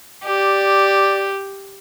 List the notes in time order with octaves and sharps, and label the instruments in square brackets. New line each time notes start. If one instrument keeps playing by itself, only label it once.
[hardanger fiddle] G4 [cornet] D5